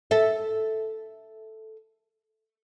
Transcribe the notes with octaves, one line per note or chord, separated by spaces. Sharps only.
A4 E5